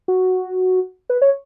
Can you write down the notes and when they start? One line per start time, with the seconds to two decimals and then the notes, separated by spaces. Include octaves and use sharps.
0.08 F#4
1.10 B4
1.22 C#5